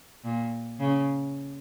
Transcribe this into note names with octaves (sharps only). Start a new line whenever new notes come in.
A#2
C#3